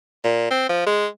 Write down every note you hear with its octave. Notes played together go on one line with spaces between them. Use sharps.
A#2
C4
F3
G#3